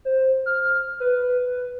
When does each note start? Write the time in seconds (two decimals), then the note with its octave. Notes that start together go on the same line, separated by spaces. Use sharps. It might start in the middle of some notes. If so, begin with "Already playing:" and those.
0.05 C5
0.46 F6
1.00 B4